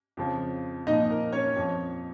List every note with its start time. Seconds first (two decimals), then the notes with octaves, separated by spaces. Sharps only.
0.17 F2 C#3 F3
0.87 A#2 D#4 D#5
0.91 F3
1.10 A#4
1.33 C#4 C#5
1.56 F2 F3